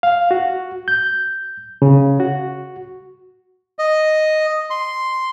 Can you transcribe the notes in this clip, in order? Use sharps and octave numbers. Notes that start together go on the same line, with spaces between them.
F5
F#4
G6
C#3
F#4
D#5
C6